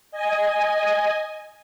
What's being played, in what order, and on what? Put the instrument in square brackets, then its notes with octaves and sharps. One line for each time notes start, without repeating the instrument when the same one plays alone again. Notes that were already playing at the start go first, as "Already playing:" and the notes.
[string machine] D#5 G#5